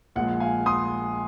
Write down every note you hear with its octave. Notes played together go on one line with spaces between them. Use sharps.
A#1 A#2 G#3 F#5
F5 G#5
C6 D#6